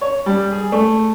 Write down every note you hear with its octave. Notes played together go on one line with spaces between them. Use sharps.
C#5
G3
G#4
A3